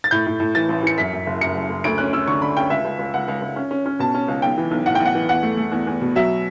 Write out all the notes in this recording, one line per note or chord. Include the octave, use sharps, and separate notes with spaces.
A6
A2 G6
A2
A2
E3 A6
A1
E3 C#7
F#2 B6
F#2
F#1
F#2 C#7
F#1
F#1
D2 D7
C#4 F#6
C#4 E6
D3 C#6
D3 B5
C#4 G5
C#2 E5
C#2
C#2
C#2 F#5
C#2
C#2
C#4
C#4
C#4
B2 A5
C#4
C#2
B1 G5
E3
B1
A2 F#5
G5
B1
F#5
E3
E2 F#5
A3
A3
E2
E2
B2
F#3 E5